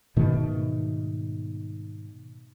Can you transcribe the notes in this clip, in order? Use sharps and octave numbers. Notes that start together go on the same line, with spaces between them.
G#2 B2 D#3 A3